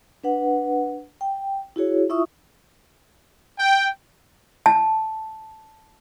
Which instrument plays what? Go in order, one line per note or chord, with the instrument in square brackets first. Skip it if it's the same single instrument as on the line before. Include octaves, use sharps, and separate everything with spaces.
[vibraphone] D4 B4 F#5
G5
E4 F#4 G#4 C#5
E4 F4 E5 C#6 D#6
[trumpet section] G5
[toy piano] A5